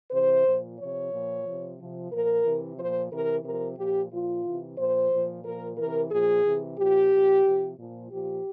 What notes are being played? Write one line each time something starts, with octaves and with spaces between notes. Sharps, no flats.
C3 E3 C5
A#2 F3
C3 F3 C#5
A#2 F3
C3 F3
C3 F3
A#2 F3 A#4
C3 E3
A#2 F3 C5
C3 E3 A#4
C3 A#4
F3
A#2 F3 G4
A#2 F3 F4
C3 E3
A#2 F3 C5
A#2 F3
A#2 F3 A#4
C3 E3 A#4
A#2 F3 G#4
C3 E3
A#2 F3 G4
A#2 F3
C3 F3
A#2 F3
A#2 F3 G4